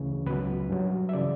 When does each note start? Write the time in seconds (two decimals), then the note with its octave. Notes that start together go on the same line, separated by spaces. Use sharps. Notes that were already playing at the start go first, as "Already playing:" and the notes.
Already playing: D2 C#3 E3 C#5
0.26 C#2 B2 F#3 B4
0.69 G2 F#3
1.09 E5
1.13 C#3 E3 D5